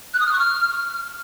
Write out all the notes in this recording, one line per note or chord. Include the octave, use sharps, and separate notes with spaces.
F#6
D#6
F6
C#6
F6